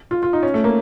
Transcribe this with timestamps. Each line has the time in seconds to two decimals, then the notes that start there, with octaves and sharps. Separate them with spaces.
0.11 F4
0.23 F4
0.33 D#4
0.43 C#4
0.54 A3
0.64 A#3